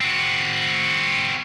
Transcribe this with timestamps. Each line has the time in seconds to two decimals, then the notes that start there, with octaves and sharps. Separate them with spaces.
0.01 C4 F#4